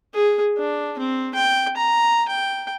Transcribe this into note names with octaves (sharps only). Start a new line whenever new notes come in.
G#4
D4
C4
G5
A#5
G5